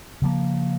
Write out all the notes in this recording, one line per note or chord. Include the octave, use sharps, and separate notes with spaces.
C#3 F3 A#3